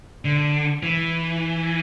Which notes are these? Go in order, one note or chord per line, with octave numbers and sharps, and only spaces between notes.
D3
E3